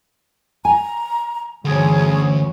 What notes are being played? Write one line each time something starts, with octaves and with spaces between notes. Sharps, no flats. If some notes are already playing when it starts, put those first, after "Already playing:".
G#5 A#5
D2 G2 E3 C#4 G#4